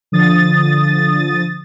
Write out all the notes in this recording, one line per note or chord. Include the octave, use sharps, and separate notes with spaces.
D3 F3 D#6 A6